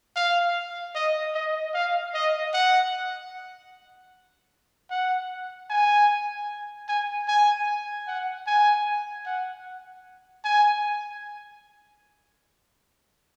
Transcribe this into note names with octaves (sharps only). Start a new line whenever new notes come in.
F5
D#5
D#5
F5
D#5
F#5
F#5
G#5
G#5
G#5
F#5
G#5
F#5
G#5